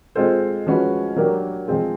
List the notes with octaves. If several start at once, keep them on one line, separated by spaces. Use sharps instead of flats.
G#3 C4 F4 A4 C5
F3 G#3 C#4 F#4 B4
F#3 A#3 D4 G4 A#4
F3 G#3 C4 F4 G#4